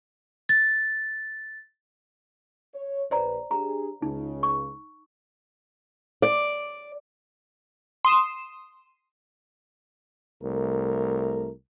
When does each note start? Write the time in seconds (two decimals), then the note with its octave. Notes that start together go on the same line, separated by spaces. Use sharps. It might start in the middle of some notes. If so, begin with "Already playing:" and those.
0.49 A6
2.74 C#5
3.11 A#1 B4 C5 D5 A#5
3.51 D4 G4 G#4 A#5
4.02 C#2 C#3 D#4
4.43 C#6
6.22 D5
8.05 C6 D#6 E7
10.43 C2 A3 A#4